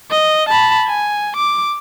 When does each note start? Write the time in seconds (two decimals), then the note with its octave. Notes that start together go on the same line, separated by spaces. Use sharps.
0.11 D#5
0.49 A5 B5
0.88 G#5
1.37 D6